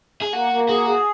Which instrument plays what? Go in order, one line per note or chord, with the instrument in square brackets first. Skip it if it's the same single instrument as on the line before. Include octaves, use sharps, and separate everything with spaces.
[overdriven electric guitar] G#4
[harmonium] A#3 [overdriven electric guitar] F#4
[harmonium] A#3
[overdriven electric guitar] F#4 [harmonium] G#4
[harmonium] G#4